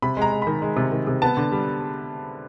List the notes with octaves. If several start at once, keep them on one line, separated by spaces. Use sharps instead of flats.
C3 B5
G#3 A#5
G#3
D#3 B5
G#3
C3
D#3
C3
B3 A5
D3
G3